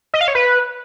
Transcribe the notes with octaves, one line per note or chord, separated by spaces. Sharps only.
D#5
F5
C#5
B4